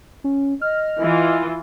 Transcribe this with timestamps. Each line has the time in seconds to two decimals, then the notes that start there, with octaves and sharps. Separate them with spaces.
0.24 C#4
0.62 D#5 F6
1.01 E3 F4